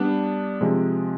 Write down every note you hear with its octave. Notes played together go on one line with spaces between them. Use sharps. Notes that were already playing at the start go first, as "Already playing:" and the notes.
Already playing: G3 B3 D4
C3 F3 G#3